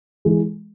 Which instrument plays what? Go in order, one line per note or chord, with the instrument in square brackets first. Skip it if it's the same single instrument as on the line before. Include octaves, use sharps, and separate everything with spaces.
[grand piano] E3 G#3